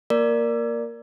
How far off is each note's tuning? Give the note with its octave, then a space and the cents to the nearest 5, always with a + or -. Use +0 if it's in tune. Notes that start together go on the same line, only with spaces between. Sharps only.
A#3 +0 A#4 +0 D5 +0